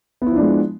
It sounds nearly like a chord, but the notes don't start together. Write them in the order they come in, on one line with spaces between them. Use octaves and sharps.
B3 E4 F3 D4 G#3